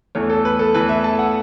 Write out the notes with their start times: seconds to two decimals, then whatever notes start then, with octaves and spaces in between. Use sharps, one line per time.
0.15 E2 E3 A3 C#5
0.30 A4
0.45 B4
0.59 A4
0.74 E2 E3 A3 B4
0.89 E5
1.04 A5
1.19 F#5